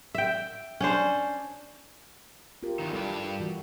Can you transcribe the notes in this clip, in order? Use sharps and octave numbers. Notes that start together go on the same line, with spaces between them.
E5 G5
C#4 D4 C5
F4 G4 A#4
E2 G2 D#3
G2 E4 G4 A4
E3 F#4